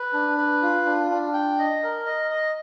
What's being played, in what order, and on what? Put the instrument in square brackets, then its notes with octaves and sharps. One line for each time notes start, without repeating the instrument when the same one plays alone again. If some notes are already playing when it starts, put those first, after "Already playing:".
Already playing: [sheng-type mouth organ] B4
D4
B4
F4
D4
D4
G5
D#5
A#4
D#5
D#5